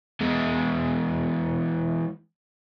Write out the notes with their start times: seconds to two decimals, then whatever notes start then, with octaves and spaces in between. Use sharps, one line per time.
0.20 E2 G#3